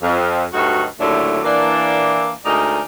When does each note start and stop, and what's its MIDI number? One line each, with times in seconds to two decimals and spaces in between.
0.02 0.44 41
0.53 0.83 38
0.53 0.83 43
0.53 0.83 54
0.53 0.83 63
0.53 0.83 66
1.00 1.39 39
1.00 1.39 45
1.00 1.39 50
1.00 1.39 54
1.00 1.39 57
1.00 1.39 62
1.43 2.30 52
1.43 2.30 58
1.43 2.30 62
2.44 2.80 38
2.44 2.80 56
2.44 2.80 63
2.44 2.80 70
2.44 2.80 74